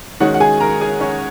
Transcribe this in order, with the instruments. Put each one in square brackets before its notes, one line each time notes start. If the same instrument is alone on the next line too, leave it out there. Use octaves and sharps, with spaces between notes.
[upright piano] D#3 G#3 C#4 F#4 F#5
F#5
G#4 G#5
A#4 A#5
G#4 G#5
C#4 C#5